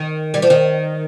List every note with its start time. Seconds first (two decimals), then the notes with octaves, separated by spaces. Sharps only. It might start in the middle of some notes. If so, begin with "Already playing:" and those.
Already playing: D#3
0.34 G3
0.42 F3
0.50 D#3